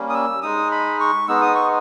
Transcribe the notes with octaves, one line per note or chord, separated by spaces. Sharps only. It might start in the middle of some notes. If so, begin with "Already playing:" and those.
Already playing: G3 A#3 C#4
D#6
E6
G#3 D#4 D#6
B5
C#6
G#3 B3 D#4 E6
D#6
C#6